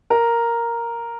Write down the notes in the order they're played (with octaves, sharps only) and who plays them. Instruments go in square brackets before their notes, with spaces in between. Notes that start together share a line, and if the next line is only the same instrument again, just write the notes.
[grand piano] A#4